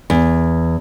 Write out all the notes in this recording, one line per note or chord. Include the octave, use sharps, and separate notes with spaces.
E2